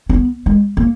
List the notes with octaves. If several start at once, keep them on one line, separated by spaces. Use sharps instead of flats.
C#4
B3
G#3
A#3